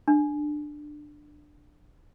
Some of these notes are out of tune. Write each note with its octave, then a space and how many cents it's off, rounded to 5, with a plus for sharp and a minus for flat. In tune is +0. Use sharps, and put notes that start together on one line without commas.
D4 +15